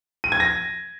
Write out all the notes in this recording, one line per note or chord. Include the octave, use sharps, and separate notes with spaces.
D#7
G#6
A#6